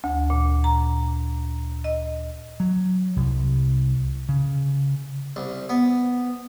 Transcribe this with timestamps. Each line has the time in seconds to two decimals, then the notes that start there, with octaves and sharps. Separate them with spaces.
0.04 D2
0.30 A#2
0.64 A#5
1.84 D#5
2.60 F#3
3.16 C2
4.29 C#3
5.36 C2
5.69 B3